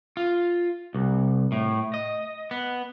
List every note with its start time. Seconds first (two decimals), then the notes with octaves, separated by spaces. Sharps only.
0.17 F4
0.94 C2
1.52 A2
1.94 D#5
2.51 B3